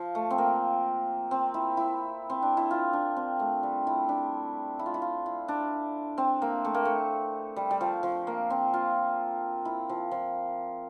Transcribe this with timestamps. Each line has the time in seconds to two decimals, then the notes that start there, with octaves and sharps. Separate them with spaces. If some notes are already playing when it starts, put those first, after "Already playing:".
Already playing: F3
0.15 A3
0.31 C4
0.38 A#3
1.31 C4
1.54 E4
1.77 E4
2.30 C4
2.43 D4
2.57 E4
2.71 F4
2.93 D4
3.17 C4
3.40 A3
3.63 G3
3.87 E4
4.09 D4
4.79 E4
4.86 F4
4.94 E4
5.02 F4
5.26 E4
5.48 D4
6.18 C4
6.42 A#3
6.65 A3
6.74 A#3
6.85 A3
7.56 G3
7.71 G3
7.81 F3
8.03 F3
8.27 A#3
8.50 C4
8.74 F4
9.65 E4
9.89 F3
10.11 F3